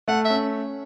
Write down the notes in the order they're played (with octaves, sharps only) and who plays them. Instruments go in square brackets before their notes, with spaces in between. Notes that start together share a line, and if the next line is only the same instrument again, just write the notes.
[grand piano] A3 [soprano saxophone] F#5
[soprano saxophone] E5
[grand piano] C#4